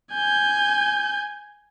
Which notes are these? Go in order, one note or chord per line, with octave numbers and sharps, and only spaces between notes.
G#5 G6